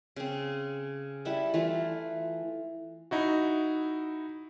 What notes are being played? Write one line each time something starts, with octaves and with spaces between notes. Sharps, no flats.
C#3 C4
G3 E4 F#5 A5
E3 A3 F4
D#4 E4 F#4